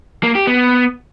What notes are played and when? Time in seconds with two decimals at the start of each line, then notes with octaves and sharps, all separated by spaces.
0.23 A#3
0.35 G4
0.47 B3